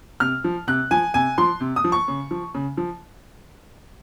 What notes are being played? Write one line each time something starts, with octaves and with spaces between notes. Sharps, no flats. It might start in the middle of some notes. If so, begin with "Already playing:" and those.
C3 F6
F3
C3 F#6
F3 G#5
C3 G#5
F3 C6
C3
D#6
F3
C#6
C#3
F3
C#3
F3